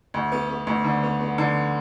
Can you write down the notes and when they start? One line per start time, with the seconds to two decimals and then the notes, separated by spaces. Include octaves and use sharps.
0.14 D2
0.32 B3
0.50 B3
0.67 D2
0.84 D3
1.03 B3
1.20 B3
1.38 D3